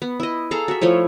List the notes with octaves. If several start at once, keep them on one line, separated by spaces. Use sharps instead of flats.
B3
E4 D#5
G#4 A4 F5 A#5
F#4 E5
F3 A3 E4 C#5